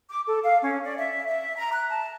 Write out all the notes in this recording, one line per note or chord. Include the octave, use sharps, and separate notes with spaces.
D6
A4
F5
C#4
D5
E5
E5
A#5
F#6
A5